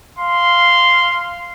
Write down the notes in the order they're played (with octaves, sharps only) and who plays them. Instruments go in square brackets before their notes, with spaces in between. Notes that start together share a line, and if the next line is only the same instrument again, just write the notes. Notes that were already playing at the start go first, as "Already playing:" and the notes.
[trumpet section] F5 C6